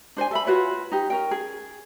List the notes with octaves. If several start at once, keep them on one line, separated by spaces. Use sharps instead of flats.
D4 C5 D#5 G#5
A4 E5 B5
F4 F#4 B4 C#5
D#4 G4
C#4 A#4 G5
G#4